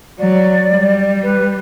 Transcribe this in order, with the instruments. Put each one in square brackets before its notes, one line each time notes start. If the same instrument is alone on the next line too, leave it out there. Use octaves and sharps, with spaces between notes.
[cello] F#3 [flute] D5
[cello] G3
[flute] B4